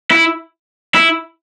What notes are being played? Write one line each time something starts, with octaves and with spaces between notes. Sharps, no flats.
E4
E4